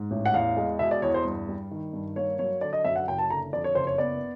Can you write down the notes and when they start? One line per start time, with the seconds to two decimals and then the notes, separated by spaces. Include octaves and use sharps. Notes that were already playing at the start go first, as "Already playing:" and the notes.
Already playing: G#2
0.11 A1
0.26 F#5
0.34 E2 F5
0.57 G#3
0.79 B2 E5
0.91 D5
1.02 E2 C#5
1.14 C5
1.25 G2
1.49 G3
1.71 D#3
1.93 G2
2.16 A#3 C#5
2.39 F#3 C#5
2.61 D3 D5
2.73 D#5
2.84 F#2 E5
2.96 F#5
3.08 F#1 G5
3.18 A5
3.30 D3 A#5
3.53 F2 D5
3.64 C#5
3.75 F#1 C5
3.87 C#5
3.98 B3 D5